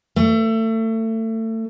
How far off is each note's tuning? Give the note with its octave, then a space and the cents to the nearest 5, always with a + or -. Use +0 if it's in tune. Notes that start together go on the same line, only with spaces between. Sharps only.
A3 +30